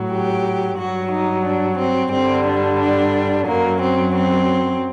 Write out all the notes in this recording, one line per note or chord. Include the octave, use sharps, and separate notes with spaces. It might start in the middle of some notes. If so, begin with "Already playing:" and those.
Already playing: A2 F#3
G4
G2 F#3 F#4
D#4
D4
C4
G2 D3 G3 C4
D4
D4
F#2 F#3 A#3
C4
C4